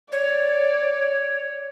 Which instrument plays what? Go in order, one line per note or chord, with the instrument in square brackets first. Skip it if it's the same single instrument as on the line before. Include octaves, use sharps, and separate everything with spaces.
[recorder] C#5 [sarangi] D5